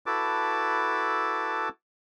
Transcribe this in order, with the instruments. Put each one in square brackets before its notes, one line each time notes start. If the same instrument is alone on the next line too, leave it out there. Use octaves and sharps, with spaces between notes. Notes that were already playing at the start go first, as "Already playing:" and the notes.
[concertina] E4 F#4 A4 B4 A5 D6